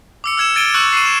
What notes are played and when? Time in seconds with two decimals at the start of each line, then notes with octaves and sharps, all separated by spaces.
0.24 D6 E6 C#7
0.37 E6 F6 G#6 C#7 E7
0.56 G#6 A6 D7 D#7 G7
0.74 C#6 E6 F#6 C#7 F#7
0.93 C7 D#7
1.06 E7